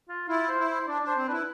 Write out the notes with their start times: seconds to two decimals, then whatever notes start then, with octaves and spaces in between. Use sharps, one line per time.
0.09 F4
0.28 E4 F4
0.49 C5
0.58 E4
0.68 C5
0.88 D4 D5
1.03 D4 C5
1.17 C4
1.27 D4 E4 B4